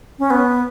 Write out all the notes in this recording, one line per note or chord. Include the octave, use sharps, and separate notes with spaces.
C#4
B3